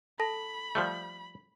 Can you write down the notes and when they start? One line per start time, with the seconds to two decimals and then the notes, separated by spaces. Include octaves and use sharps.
0.20 A4 A5 B5 A#6
0.75 F3 G3 A3